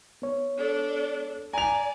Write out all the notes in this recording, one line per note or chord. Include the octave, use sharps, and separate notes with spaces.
B3 C#5
D4 A4
D5 G#5 A#5 F7